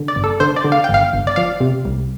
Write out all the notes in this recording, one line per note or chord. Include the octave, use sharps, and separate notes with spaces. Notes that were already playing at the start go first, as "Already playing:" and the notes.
Already playing: D3
D5
G1
A4
D3 C5
D5
D3
F5
G5
G1 F5
G1
D5
F3 F5
C3
C2